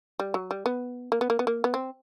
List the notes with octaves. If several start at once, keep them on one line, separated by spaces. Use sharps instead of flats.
G3
F#3
G3
B3
A#3
B3
A#3
B3
A#3
B3
C4